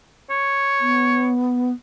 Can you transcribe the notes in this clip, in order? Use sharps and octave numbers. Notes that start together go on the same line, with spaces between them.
C#5
B3